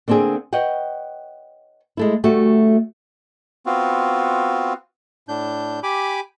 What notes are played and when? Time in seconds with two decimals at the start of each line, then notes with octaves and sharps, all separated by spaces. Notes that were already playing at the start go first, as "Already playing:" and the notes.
0.08 D3 A#3 C4 D4 G#4
0.53 B4 C#5 D#5 F#5 G5
1.97 G#3 A3 E4
2.24 D2 G3 A3 F#4
3.66 B3 C4 F4 F#4
5.28 A2 D4 G6
5.83 G4 G#5 B5 D6